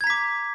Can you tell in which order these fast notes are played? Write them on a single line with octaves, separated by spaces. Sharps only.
G#6 A#5 B6 D6